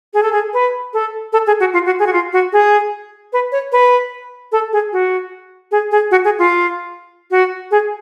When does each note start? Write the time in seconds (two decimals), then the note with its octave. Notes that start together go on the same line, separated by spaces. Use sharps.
0.14 G#4
0.23 A4
0.32 G#4
0.54 B4
0.94 A4
1.33 A4
1.47 G#4
1.60 F#4
1.73 F4
1.86 F#4
1.99 G#4
2.07 F#4
2.13 F4
2.33 F#4
2.53 G#4
3.33 B4
3.52 C#5
3.72 B4
4.52 A4
4.73 G#4
4.93 F#4
5.71 G#4
5.91 G#4
6.11 F#4
6.25 G#4
6.39 F4
7.31 F#4
7.71 G#4